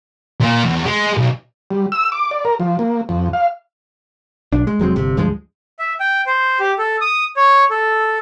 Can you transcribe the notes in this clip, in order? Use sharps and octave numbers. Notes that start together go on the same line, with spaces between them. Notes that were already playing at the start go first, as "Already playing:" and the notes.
A#2
E2
G#3
B1
G3
E6
D6
D5
A#4
F3
A#3
F2
F5
B1 D4
G#3
F1 F#3 G#3 C4
G1 C3
D2 G2 F3 G#3
E5
G5
C5
G4
A4
D#6
C#5
A4